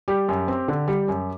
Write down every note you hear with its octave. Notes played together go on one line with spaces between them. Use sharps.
G3 G4
F#2
C4
D3
G3
F#2